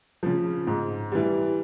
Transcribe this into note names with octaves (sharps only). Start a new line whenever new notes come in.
C#3 F3
G#2
E3 G3